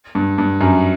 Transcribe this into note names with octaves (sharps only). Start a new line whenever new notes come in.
G2
G2
F#2